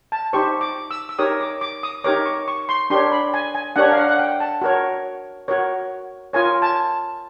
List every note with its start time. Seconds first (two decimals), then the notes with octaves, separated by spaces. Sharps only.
0.12 A5
0.33 D#4 G4 C5 C#6
0.61 D6
0.91 E6
1.09 E6
1.19 D#4 G4 A#4 C#5 D#6
1.41 D6
1.61 D6
1.83 D#6
2.04 D#4 G4 A#4 C#5 D6
2.26 C#6
2.48 C#6
2.69 C6
2.90 D4 G4 A#4 C#5 C6
3.12 B5
3.34 G#5
3.55 G#5
3.76 D4 G4 A#4 C#5 F#5
3.92 F5
3.98 F#5
4.09 F#5
4.19 G5
4.40 A5
4.61 F#4 A#4 C#5
5.48 F#4 A#4 C#5
6.33 F4 A#4 C#5 G#5
6.62 A5